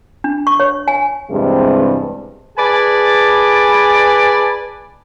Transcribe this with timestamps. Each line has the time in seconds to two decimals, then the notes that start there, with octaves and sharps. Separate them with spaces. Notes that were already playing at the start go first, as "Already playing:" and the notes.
0.24 D4
0.47 C#6
0.60 C#5
0.88 G#5
1.30 E2 G2 C3 G#3 C4
2.59 G#4 B4 D5 G#5 A5